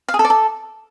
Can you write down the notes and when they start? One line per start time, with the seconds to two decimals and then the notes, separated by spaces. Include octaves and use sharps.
0.09 F5
0.14 G#4
0.19 A4
0.25 D5
0.30 A4